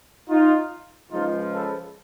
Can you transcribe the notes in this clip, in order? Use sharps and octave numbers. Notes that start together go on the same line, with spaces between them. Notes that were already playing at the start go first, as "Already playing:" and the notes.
D#4 F4
C#2 C#3 F3 G#3 D#4 F4
A4 B4